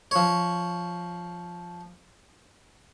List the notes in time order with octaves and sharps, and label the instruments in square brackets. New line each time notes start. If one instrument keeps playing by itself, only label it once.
[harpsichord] F3 C#5